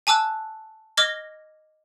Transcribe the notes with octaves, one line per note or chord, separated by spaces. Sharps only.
G#5 A5 D6 E6 F#6
D#5 D6 F6 G#6 A#6 G7